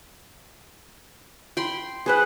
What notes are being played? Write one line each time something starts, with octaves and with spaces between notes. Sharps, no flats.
G5 B5 C6
G#4 B4 C5 F#5